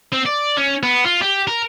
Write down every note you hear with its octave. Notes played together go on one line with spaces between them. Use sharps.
C4
D5
C#4
B3
F4
G4
A#4